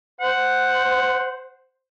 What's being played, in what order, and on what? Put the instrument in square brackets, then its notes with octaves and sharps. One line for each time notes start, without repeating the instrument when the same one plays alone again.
[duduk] C5 [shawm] F#5